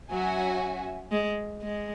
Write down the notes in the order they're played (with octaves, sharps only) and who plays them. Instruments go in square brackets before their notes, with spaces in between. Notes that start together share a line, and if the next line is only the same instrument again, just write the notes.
[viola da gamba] F#3 [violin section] C#4 F#4 E5 G#5
[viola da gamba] G#3
G#3